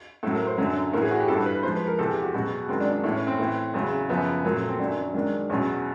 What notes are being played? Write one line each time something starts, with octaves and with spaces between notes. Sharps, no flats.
A2 F#3 A4
A#4
C5
F#2 D3 F#3
A2 E3 G#4 A#4
F#4
G4
G2 E3 A4
B4
G#2 F3 C5
B4
A#4
E2 C3 E3 A4
G4
F#4
E2 B2 F#3 F#4
G#2 D#3 F#3 C4
D4
D4
A2 E3 C#4
C#4
C4
A2 E3
E2 C#3 F#3
F#2 C#3 F3 B3
A#2 F#3 A#3
A3
C4
F#2 D#3 F#3 D4
G#2 D#3 F#3 D4
E2 B2 F#3 C#4